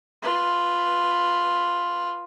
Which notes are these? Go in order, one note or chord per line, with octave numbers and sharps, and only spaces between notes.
F4 B4